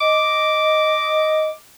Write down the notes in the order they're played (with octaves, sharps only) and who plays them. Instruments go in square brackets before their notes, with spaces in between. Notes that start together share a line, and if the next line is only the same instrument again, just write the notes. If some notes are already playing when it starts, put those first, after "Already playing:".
[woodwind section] D#5 [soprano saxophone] D6